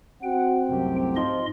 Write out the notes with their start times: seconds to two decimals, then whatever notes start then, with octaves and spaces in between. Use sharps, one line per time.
0.23 C4 F#4 F#5 G5
0.69 C2 F#2 A2 F#3 G4
1.16 G#2 F3 D#5 C6